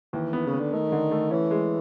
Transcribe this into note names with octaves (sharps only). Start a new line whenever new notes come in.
D#2 E3
B3
C#3
B3
D3
D#3 A3
D3
A3
E3 C#4
G#3